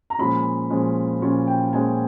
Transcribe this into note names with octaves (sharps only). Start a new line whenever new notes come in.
A#5
A#2 F3 G#3 C#4 B5
A#2 F3 G#3 C#4
A#2 F3 G#3 C#4
G5
A#2 F3 G#3 C#4 G#5